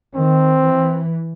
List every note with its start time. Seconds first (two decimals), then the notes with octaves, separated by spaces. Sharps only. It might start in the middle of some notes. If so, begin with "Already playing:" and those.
0.14 D#3 C4
0.64 E3